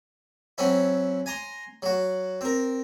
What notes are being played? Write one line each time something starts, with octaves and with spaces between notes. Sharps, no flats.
F#3 C4 C#4 E4
G#5 A#5 C6
F#3 F#4
C4 A#4